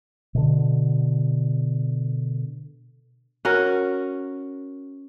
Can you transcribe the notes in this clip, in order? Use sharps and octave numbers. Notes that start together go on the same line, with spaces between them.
B2 D3
C#4 F#4 A#4